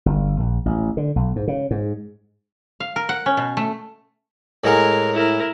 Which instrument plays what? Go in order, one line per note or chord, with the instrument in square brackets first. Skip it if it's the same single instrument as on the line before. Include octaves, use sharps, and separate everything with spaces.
[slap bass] G1
A#1
A1
D3
B1
G#2
C#3
G#2
[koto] F5
A#4
F#5
C#4
B2
A3
[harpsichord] A2 G#3 F#5 [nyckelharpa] A#4
[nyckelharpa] E4 A#4